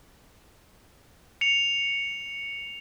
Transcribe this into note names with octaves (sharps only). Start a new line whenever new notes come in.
C#7 F7